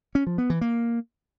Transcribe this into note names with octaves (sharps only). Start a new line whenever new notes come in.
C#4
F3
B3
E3
A#3